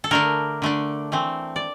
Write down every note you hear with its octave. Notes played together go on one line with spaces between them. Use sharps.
A4
D3 A3 D4 A#4
D3 A3 D4
E3 A3 C4
D5